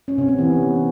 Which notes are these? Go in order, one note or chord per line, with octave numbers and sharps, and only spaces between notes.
C#4
C3
B3
E3